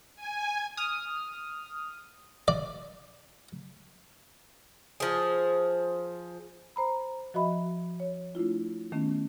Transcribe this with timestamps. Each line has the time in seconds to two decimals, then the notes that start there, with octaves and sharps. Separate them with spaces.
0.15 G#5
0.77 D#6 F6
2.48 D5
5.00 F3 G#4
6.76 C5 A#5 B5
7.34 F3 F#4 D#5 E5 B5
8.00 C#5
8.35 A3 D4 E4 F4
8.92 D#3 A3 B3 C#4